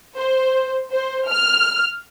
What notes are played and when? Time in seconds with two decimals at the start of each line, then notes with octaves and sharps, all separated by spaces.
0.18 C5
0.93 C5
1.28 F6